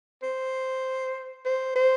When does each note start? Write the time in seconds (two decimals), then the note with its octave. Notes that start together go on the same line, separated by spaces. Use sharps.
0.23 C5
1.46 C5
1.75 C5